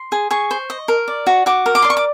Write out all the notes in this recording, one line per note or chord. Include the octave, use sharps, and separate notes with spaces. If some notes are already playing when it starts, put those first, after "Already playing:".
Already playing: C6
G#4
G#4 C#6
C5
D#5
A#4
D5
F#4
F#4 D6
A#4
D6
D5 C6
C#6
D6